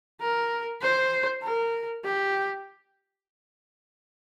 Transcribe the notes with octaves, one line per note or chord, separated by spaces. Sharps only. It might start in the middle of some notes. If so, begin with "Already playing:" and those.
A#4
C5
A#4
G4